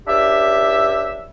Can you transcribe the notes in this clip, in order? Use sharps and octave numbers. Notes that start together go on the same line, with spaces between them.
C#2 D4 G4 E5